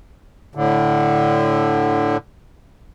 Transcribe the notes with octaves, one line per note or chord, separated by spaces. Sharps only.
A2 D3